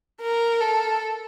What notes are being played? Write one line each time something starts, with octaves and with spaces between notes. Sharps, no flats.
A#4
A4